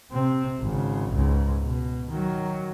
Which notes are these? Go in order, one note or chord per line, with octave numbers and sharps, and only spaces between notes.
C3 C4
G#1 C#3
C#2 G#2
B2
D#3 F#3